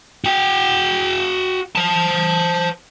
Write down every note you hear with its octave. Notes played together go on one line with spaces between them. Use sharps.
F#4 G5
C5 A5